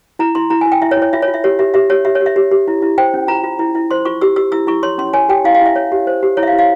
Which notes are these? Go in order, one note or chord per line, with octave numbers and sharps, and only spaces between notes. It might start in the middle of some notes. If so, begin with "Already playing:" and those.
E4 A#5
E4 C6
E4 A#5
E4 G#5
G5
E4 E5
C#5
E4
C#5
F4 E5
C#5
F4
E5
G4 C#5
G4 E5
G4 E5
G4 C#5
G4 E5
C#5
G4
E5
G4
G4
E4
E4
C5 G5
C#4
F4 A#5
F4
E4
E4
C5 C6
F4 C#6
G4 E6
G4 E6
E4 E6
E4 C#6
C#5 C6
C#4 C6
C#5 G#5
G4 G5
E4 F5
F5
E4 E5
C#5
G4
C5
G4
E4 C#5
E5
F5
E4
F5